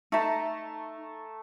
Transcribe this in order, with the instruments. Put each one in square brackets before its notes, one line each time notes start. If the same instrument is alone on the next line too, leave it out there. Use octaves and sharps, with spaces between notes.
[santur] A3 A5 A#5 [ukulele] D#4 E5